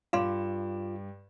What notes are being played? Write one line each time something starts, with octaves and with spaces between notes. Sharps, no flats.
G2 F4 F5 C6 D6 E7